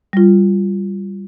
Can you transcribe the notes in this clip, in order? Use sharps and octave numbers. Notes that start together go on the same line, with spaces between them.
G3 F4